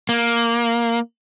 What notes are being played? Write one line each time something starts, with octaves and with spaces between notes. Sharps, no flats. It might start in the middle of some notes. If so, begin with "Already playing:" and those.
A#3